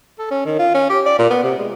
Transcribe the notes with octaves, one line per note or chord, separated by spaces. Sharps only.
A4
C#4
D#3
F4
C#4
G4
D5
A#2
B3
C3
G#3